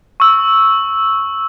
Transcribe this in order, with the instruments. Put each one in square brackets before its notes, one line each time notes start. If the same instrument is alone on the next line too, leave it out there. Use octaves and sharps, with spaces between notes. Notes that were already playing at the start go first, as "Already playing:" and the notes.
[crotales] C#6 E6